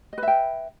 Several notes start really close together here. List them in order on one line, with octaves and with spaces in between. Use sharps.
D#5 B4 E5 G5